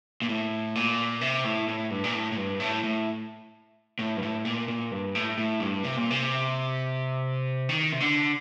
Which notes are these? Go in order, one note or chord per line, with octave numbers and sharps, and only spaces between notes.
A#2
A2
A#2
C3
A2
A2
G2
A#2
A2
A2
G2
A2
A2
A2
G2
A2
A#2
A#2
G2
A2
A2
G2
C3
A#2
C3
D#3
C3
D3